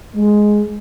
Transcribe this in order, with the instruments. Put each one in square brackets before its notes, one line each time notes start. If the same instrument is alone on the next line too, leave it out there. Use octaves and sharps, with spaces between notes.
[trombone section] G#3